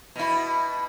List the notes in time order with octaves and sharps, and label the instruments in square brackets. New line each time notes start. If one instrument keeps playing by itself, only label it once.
[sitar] B2 E4